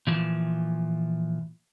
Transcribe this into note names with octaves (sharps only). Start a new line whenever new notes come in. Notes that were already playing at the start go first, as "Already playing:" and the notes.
A#2 E3 F3